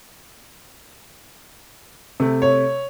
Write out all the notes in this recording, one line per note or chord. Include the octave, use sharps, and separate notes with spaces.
C3 A3
C#5